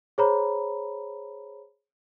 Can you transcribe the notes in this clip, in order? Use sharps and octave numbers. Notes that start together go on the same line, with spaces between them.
G#4 C5 C#5 A#5 B5